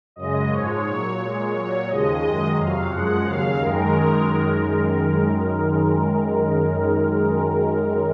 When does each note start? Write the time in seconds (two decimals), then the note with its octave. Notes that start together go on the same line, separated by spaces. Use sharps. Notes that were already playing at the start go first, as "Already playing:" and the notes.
0.16 F#2 C#3 G#3 D#5
0.50 G#2 F3 G#3 C#5
0.85 A#2 F#3
1.19 A#2 G#3
1.53 A#2 F#3 C#5
1.87 D#2 C#3 F3 G#3 D#5
2.21 F#2 D#3 G#3
2.56 F2 C3 F#3 F5
2.90 F#2 F3 G#3 F#5
3.24 D#2 C#3 F#3 F5
3.58 F#2 D#3 G#3 A#4